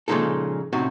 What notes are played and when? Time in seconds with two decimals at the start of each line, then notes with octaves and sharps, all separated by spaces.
0.08 A#2 C#3 F3 G#3 D#4 A4
0.73 A2 C3 C#4 D#4 F#4